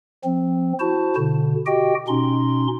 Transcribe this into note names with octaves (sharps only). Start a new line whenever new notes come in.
F3 C4
E4 F#4 C5 A5
B2 D3
F#4 G4 D#5 G5
B2 C#4 D#4 C6